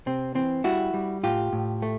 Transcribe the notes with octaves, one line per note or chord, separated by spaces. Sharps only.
C3 C4
E3 C4
G3 E4 F#4
G3
A2 F4 G4
A2
A3